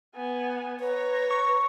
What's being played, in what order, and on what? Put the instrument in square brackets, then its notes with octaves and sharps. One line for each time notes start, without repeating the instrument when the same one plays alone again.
[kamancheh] B3 G#5
[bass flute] B4 [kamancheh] C#5 A#5
[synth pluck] C#6